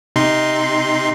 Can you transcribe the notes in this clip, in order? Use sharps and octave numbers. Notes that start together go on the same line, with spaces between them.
C3 D#4 C6